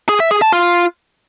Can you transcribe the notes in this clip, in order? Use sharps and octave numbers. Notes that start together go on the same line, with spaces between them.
G#4
E5
G#4
A5
F4